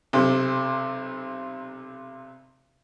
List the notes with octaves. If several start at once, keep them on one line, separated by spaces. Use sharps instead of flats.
B1 C3